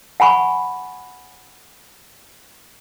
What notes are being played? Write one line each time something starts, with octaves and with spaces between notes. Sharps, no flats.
F#5 G#5 B5 C#6